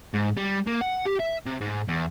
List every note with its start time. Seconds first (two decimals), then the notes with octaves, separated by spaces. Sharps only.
0.14 G#2
0.37 G3
0.67 A#3
0.81 F#5
1.06 G4
1.20 E5
1.46 C3
1.61 G#2
1.88 E2